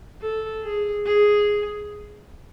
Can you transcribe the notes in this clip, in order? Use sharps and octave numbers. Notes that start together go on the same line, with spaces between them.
A4
G#4
G#4